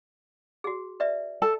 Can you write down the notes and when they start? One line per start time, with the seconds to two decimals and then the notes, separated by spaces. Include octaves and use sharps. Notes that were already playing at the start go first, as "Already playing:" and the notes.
0.64 F#4 G#4
1.00 B4 D5 E5
1.42 A4 A5